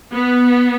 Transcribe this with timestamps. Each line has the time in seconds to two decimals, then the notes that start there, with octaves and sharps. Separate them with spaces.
0.12 B3